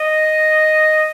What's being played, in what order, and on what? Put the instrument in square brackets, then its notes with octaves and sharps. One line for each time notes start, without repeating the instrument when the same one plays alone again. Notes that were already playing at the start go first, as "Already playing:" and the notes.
Already playing: [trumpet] D#5